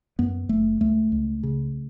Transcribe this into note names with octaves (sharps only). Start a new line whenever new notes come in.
F#2 B3
F#1 A3
C#2 A3
C#2
C#3